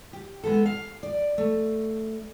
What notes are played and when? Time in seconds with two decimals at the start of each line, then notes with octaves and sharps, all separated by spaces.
0.13 G4
0.44 G#3 B3 A4
0.66 F5
1.03 D5
1.38 A3